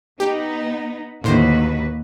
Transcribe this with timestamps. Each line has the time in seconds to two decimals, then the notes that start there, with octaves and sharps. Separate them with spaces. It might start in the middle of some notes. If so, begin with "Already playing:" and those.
0.20 B3 D#4 G4
1.24 D#2 A2 D3 F#4 B4 C5